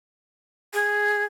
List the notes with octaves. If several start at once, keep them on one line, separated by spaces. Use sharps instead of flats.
G#4